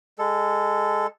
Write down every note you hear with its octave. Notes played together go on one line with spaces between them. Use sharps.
G#3 A4